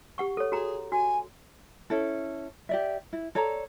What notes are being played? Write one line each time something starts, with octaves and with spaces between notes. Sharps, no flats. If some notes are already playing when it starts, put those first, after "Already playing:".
G4 F#5 C#6
A4 C#5
F#4 G#4 A#5
F#4 G#5
C#4 E4 A4
G4 D5 E5
E4
A4 C#5 D5 A#5